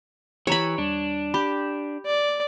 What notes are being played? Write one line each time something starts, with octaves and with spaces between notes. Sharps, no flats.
E3 G4 C#5 A#5 B5
D#2 G3 D4
G4 B5
D5